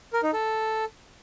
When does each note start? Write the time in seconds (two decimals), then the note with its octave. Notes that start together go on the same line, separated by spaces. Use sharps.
0.13 A#4
0.23 D#4
0.33 A4